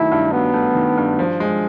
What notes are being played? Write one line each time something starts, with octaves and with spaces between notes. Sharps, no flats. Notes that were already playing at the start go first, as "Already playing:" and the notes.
Already playing: D#3 F#3 A3 E4
G2
F#3 B3
A3
D#3
G2
F3
G#3